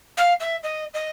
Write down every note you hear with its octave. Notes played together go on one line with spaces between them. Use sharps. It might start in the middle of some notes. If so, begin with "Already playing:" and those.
F5
E5
D#5
D#5